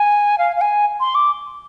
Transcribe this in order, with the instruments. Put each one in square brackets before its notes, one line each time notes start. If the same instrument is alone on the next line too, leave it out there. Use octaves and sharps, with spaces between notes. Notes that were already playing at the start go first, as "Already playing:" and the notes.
Already playing: [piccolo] G#5
F5
F5
G#5
C6
D6